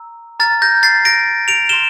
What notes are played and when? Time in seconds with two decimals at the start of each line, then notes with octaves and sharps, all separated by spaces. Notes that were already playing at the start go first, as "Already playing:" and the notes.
Already playing: A#5 E6
0.40 A#5 F6 A6
0.62 G6 A#6
0.83 A6 C7
1.05 A#6 D7
1.48 D7 F7
1.69 F6 E7 G7
1.73 C6